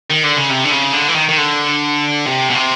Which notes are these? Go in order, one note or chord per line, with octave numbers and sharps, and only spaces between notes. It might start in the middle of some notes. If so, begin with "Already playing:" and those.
D#3
D3
C#3
C3
D3
C#3
D3
E3
D#3
D#3
D3
C3
B2
C3